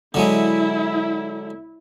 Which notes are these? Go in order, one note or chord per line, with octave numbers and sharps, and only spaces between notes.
D3 F#3 G#3 E4